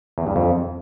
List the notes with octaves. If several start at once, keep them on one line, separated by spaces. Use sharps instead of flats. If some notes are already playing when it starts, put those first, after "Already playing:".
E2
G2
F2